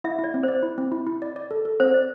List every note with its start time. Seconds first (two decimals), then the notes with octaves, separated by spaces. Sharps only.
0.04 E4 E5
0.19 E4 D5
0.34 C4
0.43 C5 D5
0.63 E4
0.78 C4
0.92 E4
1.07 E4
1.22 D5
1.36 D5
1.51 A4
1.65 A4
1.80 C4 C5
1.94 D5